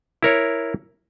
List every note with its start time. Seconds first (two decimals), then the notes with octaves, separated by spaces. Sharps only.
0.23 E4 A#4 C#5